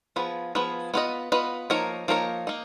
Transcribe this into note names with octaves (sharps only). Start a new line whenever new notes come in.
F3 B3 F4 G#4 B4
F3 B3 F4 G#4 B4
B3 F4 B4 D#5
B3 F4 B4 D#5
F3 A#3 D#4 A#4 C#5
F3 A#3 D#4 A#4 C#5
A#3 D#4